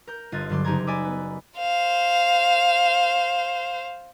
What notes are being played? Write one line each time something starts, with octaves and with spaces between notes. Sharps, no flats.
A#4 G6
G1 F4 D#5 F#6 G#6 A6
G2 D3 F#3 C6 D6
F#1 D#4 G4 A#5 G#6
D5 D#5 G#5 B5 D6 E6
B3
C5 F5